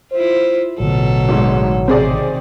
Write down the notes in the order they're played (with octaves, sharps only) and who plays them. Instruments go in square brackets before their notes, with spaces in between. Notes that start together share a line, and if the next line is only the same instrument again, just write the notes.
[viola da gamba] E4 F4 [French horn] C5
[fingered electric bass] A1 D3 [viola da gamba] B2 A4 [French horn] F#3
[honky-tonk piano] G#1 G#2
[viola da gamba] C3 D#3 [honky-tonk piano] C4 G#4 D5